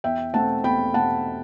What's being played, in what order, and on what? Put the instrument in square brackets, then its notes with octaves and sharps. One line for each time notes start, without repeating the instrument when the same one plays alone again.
[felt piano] E2 E5 G5
B2 A3 C4 F#5 A5
E2 G5 B5
B2 A3 C4 F#5 A5